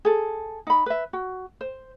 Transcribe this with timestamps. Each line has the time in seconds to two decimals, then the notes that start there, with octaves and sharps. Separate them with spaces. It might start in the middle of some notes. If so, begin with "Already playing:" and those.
0.05 G#4 A4
0.67 D#4 B5
0.86 B4 E5
1.13 F#4
1.61 C5